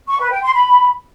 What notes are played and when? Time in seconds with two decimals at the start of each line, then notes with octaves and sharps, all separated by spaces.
0.07 C#6
0.19 B4
0.31 G5
0.43 C6
0.55 B5